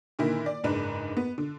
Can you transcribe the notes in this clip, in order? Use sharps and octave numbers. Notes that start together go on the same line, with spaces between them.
A#2 D3 D#3 E4
D5
F#1 G#2 D4 B4
B3
D3